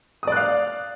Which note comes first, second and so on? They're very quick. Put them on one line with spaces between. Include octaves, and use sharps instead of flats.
D#6 D5 F#6 F5